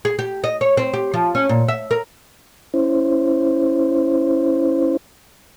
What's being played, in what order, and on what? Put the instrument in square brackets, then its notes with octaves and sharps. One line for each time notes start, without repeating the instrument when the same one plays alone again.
[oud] G#4
G4
D#5
C#5
C4
G4
F3
C#4
A#2
E5
A#4
[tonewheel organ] C#4 E4 C5